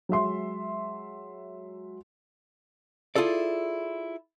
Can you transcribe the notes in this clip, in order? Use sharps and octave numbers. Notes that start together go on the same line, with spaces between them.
F#3 G#3 E5 C6
E4 F4 G#4 A4 D5